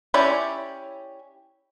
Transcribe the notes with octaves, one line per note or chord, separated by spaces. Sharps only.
C#4 E4 G4 C#5 D5